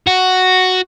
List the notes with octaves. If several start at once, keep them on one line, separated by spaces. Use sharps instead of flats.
F#4